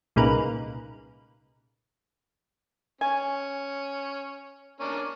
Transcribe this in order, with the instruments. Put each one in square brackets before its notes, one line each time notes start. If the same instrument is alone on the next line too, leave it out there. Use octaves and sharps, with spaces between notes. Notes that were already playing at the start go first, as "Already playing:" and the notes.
[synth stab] C2 A#2 C#3 D#4 A#4 B4
[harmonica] C#4 [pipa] G#5
[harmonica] A#3 C#4 D4